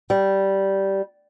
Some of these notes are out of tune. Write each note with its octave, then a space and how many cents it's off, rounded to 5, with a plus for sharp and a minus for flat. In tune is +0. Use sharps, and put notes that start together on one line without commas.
G3 -10